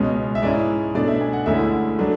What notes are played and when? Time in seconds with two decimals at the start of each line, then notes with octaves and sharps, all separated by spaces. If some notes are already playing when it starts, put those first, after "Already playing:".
Already playing: C#2 B2 G#3 C#4
0.35 E5
0.42 G#2 G#3 C#4 E4 D5
0.95 B2 A3 D4 D5
1.07 E5
1.21 G#5
1.33 F#5
1.46 D2 D3 G#3 C#4 E4 E5
1.99 F#3 A3 D4